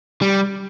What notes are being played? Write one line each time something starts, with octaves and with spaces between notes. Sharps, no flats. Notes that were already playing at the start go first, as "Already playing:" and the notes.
G3